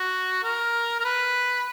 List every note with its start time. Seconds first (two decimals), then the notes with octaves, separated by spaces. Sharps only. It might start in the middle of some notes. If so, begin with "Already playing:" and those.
Already playing: F#4
0.44 A#4
1.00 A#4
1.05 B4